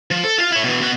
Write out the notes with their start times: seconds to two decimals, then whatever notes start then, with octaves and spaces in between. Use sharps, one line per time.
0.11 F3
0.24 A4
0.38 F4 F5
0.52 E4 C#5
0.64 B2 E3
0.81 B2 F#4